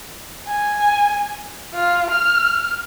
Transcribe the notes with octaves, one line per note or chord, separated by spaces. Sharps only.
G#5
F4
F6